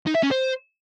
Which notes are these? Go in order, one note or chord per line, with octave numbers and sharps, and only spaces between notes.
D#4
E5
C#4
C5